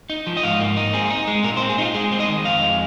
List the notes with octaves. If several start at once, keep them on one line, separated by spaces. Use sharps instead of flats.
D#4
F3
D#5
G#2 F5
A#3
D#4
C4 G#4
D#4
G#3
A#2 A#4
C5
C4
G#4
D#4 F4
G#3 G#4
C4
D#5
D#3
F2 F5
G#3